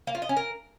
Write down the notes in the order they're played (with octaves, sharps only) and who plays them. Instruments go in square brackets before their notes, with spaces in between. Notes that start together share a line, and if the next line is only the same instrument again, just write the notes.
[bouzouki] A#3
F4
D#5
C#4
A#4